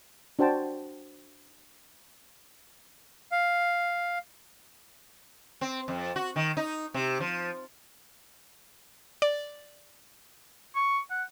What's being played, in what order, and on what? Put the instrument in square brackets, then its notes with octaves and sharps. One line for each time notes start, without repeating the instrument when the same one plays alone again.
[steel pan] D4 F#4 C5 G5 A5
[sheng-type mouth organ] F5
[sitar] C4
F2
F#4
D#3
D#4
C3
F3
[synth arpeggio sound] D5
[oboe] C#6
F#5